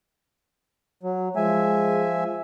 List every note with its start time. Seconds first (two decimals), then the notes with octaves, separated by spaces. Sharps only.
1.03 F#3
1.36 F3 G#3 E5 G#5